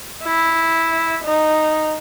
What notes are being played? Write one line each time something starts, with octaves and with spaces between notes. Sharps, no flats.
E4
D#4